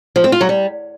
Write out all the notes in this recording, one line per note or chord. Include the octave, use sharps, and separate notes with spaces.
F3
C4
F4
F#3
G3